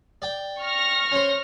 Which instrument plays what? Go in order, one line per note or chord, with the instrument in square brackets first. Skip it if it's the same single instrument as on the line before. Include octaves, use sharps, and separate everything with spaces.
[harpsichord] D5 G5
[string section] C#6 F6 A#6
[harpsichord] C#4 C5